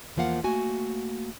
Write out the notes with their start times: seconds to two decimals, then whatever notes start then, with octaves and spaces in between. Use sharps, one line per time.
0.16 E2 E3 F3 A#3 F5 F#5
0.43 A3 A#3 F#4 G#5